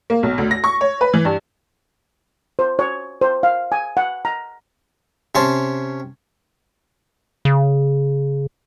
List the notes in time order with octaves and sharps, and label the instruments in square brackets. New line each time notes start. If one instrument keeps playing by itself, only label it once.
[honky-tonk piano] A#3
B1
D2
A#6
C#6
C#5
B4
E3
G2
[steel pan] C5
C#5
C5
F5
G#5
F#5
A#5
[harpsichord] C3 C#4 A5 C6
[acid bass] C#3